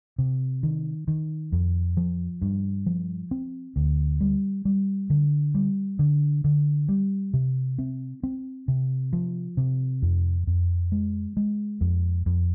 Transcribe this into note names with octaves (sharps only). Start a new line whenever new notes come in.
C3
D#3
D#3
F2
F3
G2
F3
C4
D2
G3
G3
D3
G3
D3
D3
G3
C3
C4
C4
C3
F3
C3
F2
F2
G#3
G#3
F2
F2